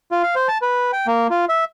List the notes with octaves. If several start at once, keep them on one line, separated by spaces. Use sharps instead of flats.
F4
F5
C5
A5
B4
G5
A#3
F4
E5